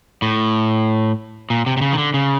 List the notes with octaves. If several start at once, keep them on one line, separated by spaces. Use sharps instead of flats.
A2
A#2
C3
C3
C#3
D#3
D3
C#3